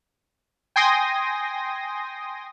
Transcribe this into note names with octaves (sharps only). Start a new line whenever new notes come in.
G5 G#5 C6 D#6 A#6